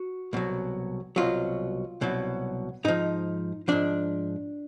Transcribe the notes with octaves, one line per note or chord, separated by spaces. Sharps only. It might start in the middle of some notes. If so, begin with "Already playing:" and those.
Already playing: F#4
C2 B2 F#3
C2 B2 F#3 F4
C2 B2 F#3
G#2 F3 D#4
G#2 F3 D4